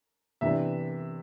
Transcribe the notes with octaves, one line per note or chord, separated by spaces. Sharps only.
C3 E3 B3 D4 E5